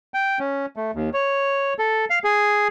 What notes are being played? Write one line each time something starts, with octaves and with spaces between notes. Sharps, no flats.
G5
C#4
A3
D#2
C#5
A4
F5
G#4